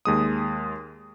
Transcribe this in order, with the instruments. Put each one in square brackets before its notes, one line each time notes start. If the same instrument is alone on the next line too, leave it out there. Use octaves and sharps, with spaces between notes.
[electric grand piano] D#2 G#3 D#6